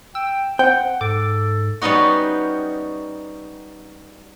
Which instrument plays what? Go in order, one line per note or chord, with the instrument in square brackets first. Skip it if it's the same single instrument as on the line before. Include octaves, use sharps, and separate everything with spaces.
[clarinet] G5 [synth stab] E6
[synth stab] C4 [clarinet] F#5 [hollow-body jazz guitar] G5
[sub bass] G#2 [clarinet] A4 [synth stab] D6
[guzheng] G3 B3 C#4 D#4 F#4